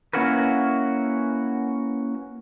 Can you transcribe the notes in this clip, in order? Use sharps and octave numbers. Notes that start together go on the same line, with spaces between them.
A#3 C#4 E4 F#4 A#4 B4